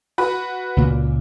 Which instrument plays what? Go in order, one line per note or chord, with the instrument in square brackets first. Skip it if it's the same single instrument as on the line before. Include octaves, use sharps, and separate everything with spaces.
[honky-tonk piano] F#4 B4 B5
[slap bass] C#2 A#2 A#3